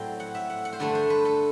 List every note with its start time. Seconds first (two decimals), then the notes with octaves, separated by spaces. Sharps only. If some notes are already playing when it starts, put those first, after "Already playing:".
Already playing: A2 F#3 C4 D5 E5 G5
0.20 F#5
0.35 E5
0.50 F#5
0.65 F#5
0.73 C5
0.79 G2 D3 A3 D4 D5
0.95 C5
1.10 B4
1.25 A4